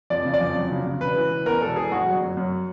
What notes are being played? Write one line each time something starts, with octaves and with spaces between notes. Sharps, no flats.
F2 D5
C#3
D5
F2
F#3
C#3
C#3
E1 B4
E3
E3
E2 A#4
E1 A4
E3 G#4
G1 F#4
F#3
F#2
F#2